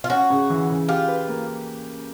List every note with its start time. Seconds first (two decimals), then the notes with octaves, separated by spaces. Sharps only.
0.04 F4
0.10 C#4 F#4
0.30 C#3
0.50 E3
0.70 C#3
0.89 F4 G4
1.08 B4
1.28 A#3